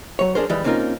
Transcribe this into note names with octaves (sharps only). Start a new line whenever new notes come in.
F#3 C#5
D4 G#4 A#4 C5
E3 G3 G#3
A#3 C4 C#4 D#4 F4 A#4